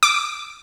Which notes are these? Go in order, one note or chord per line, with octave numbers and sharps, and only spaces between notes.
D6